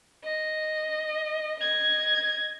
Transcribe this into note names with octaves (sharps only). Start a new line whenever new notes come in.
D#5
D#5 G#6